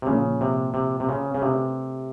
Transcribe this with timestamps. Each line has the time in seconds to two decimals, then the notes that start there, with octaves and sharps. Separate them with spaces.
0.02 C3
0.07 A#2 C#3 F3 A#3
0.41 C3
0.74 C3
1.00 C3
1.09 C#3
1.35 C#3
1.42 C3 A3 D4 G4 B4